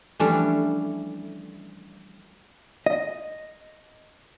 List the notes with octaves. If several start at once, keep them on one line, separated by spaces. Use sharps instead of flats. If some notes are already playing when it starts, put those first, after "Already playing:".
E3 F3 G3 A3 C#4 D4
D#5